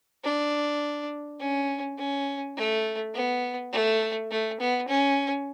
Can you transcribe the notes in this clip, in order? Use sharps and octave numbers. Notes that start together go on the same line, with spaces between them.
D4
C#4
C#4
A3
B3
A3
A3
B3
C#4